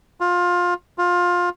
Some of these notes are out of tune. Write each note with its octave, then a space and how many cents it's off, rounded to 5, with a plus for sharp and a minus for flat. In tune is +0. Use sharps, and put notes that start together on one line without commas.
F4 +20
F4 +20